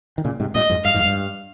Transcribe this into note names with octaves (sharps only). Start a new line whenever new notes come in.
D#3
A#2 C#3
G#2 C3
G2 A#2 D#5
F2 G#2
G2 F5
F2 G#2
G2